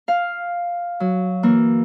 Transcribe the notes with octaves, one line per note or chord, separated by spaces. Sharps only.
F5
F#3
E3 A#3